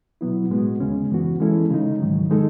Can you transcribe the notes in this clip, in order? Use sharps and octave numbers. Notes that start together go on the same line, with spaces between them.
B2 F#3 B3 E4
A2 G#3 B3 F#4
D#2 C#3 G#3 C#4
F#2 E3 B3 F#4
E3 G#3 C#4 E4 A4
C#3 G#3 D#4
G#2 D#3 F#3
D#3 G#3 D#4 A4